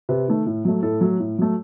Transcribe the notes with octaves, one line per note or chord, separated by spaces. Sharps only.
C3 B4
D#3 A3
A2
F#3 A3
A2 A4
F#3 A3
A2
F#3 A3